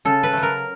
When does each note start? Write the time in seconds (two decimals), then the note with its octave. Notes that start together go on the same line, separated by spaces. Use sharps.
0.05 C#3 A4
0.23 B4
0.33 F#3 A3
0.43 A#4